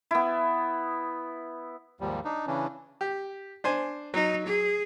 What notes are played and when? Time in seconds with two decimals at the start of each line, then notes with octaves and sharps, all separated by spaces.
0.11 B3 E4
2.01 D#2 G#2 F3 G3
2.25 D4 D#4
2.47 C#3 E3 C#4 D4
3.01 G4
3.64 D4 C5 G#5
4.14 F#3 D#4
4.46 G#4